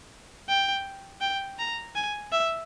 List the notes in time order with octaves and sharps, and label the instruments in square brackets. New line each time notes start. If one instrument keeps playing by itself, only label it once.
[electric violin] G5
G5
A#5
G#5
E5